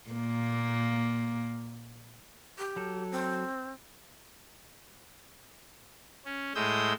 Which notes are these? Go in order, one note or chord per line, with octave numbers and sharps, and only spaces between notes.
A#2 A#3
G4
F#3 A4
C4
C#4
A2 G#3 D#6 E6 G6